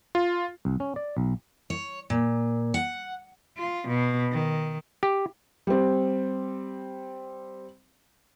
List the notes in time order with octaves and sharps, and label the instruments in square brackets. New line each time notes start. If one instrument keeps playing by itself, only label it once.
[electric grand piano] F4
[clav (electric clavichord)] C2
C#4
D5
B1
[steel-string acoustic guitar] C#5
A#2
F#5
[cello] F4
B2
D#3
[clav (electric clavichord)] G4
[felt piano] G3 C4